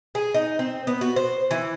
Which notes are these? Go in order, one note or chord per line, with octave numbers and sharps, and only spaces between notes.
G#4
D#4
C4
B3
F#4
C5
E3